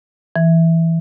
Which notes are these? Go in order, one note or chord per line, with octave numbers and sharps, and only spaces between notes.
E3